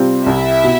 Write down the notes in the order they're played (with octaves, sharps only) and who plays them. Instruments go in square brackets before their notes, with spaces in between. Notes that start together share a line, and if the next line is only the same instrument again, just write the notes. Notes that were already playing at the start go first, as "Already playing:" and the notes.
Already playing: [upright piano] C3 G3 C4 F4
[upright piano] C2 [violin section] E4 E5
[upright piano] B2